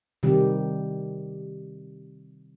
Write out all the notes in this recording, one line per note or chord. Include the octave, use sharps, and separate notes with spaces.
C3 D#3 G3 G4